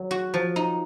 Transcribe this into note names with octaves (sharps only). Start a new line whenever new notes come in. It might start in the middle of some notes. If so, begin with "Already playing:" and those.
Already playing: F#3
F#4
F3
D#4